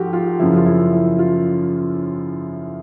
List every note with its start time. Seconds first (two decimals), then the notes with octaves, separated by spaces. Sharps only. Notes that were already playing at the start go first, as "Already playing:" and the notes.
Already playing: G#2 F3 A3 F#4 G4
0.13 F4
0.39 F#2 C#3 F3 E4
0.57 F4
0.66 E4
0.93 E4
1.19 F4